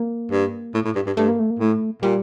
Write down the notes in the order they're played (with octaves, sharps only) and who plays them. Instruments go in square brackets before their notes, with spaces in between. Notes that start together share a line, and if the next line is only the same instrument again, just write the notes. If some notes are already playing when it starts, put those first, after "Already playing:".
Already playing: [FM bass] A#3
[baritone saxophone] G2
A2
A2
G2
G2
[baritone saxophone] G2 [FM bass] A3
[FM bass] A#3
A3
A#3
[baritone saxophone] A2 [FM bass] A3
[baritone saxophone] A#2 [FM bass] G3